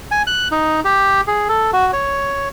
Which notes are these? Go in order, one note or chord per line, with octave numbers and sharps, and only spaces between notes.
G#5
F#6
D#4
G4
G#4
A4
F#4
C#5